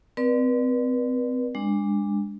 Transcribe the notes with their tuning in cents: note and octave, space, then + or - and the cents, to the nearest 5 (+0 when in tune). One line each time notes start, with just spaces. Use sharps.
C4 -30 B4 -35 D5 +20
G#3 -30 D4 +0